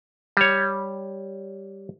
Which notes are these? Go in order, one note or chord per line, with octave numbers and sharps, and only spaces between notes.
G3 C#5